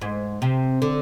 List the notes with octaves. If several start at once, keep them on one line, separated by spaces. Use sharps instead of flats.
G#2
C3
D3